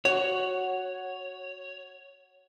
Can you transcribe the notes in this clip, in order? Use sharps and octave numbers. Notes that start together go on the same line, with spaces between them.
F#4 C#5